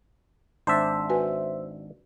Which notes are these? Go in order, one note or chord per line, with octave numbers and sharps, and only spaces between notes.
G#1 D4 C5 E5 A5
F#4 B4 G#5